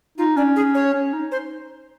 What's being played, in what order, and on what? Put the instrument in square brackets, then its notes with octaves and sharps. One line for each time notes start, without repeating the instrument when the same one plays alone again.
[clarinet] D#4 [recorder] F4
[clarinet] C#4 [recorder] D4
[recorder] G#4
C#5
[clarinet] C#4
D#4
[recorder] C5